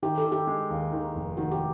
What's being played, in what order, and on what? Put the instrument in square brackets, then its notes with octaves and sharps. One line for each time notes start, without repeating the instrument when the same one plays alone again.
[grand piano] D#3 [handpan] G4
[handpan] A4
[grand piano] D#3
[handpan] G4
[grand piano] G#3
D#2
D#3
F1
[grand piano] D#3 [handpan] F#4
[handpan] G4